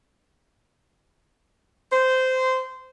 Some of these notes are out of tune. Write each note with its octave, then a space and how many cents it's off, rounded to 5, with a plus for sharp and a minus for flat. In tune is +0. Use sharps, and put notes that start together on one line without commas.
C5 -15